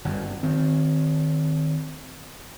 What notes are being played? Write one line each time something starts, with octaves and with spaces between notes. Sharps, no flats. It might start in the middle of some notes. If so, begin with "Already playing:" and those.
G1 F#2
D#3 C4